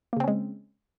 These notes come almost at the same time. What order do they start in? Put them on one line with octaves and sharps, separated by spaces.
A#3 C#3 C4 C#4 G#3